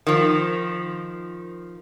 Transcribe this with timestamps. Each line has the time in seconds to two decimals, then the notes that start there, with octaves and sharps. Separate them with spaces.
0.07 D#3 F3